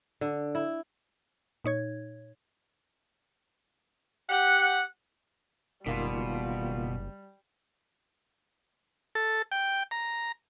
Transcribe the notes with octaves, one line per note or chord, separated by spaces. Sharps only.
D3
E4
A#2 D#4 C#5 G#6
G4 F#5
F#1 B2 D#3 G3 A#3 F4
A4
G5
A#5